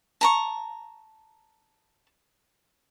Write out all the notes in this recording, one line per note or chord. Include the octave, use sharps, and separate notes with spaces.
A5 A#5 C#6